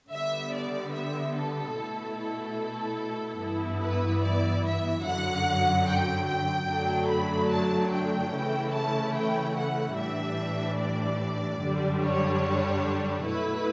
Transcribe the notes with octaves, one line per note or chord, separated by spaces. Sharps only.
D3 G3 B3 E5
D5
E5
A4
B2 A3 E4
A4
G2 E3 B3 E4
B4
D5
E5
F#2 D3 F#3 F#5
G5
G5
F#2 D3 F#3 A3 D4
B5
A5
G5
C#3 E3 A3 C#4 E4
A5
G5
F#5
A2 E3 G3 D4 E5
D5
F#2 D3 G3 D4
C#5
B2 A3 E4 B4